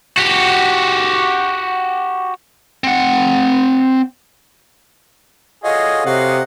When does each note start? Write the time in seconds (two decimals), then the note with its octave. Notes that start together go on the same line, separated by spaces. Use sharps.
0.18 F#4 G4
2.84 C4 F#5
5.64 F4 F#4 G#4 A4 C#5 D#5
6.06 C3 F#4 F5 F#5